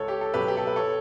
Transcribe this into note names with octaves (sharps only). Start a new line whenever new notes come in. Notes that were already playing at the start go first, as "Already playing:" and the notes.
Already playing: C#2 A4 C#5
G4
A4
B2 F#3 G4 B4
G4
A4
B4
A4 C#5